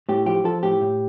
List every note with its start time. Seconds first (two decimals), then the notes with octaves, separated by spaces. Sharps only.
0.09 A2 G4
0.26 F3 G4
0.44 F3 A4
0.63 A2 G4
0.81 A2